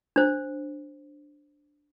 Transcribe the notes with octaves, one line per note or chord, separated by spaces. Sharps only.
D4 C5